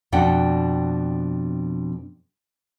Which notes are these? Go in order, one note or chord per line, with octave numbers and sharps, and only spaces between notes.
F2 B2 D4 F#5 G5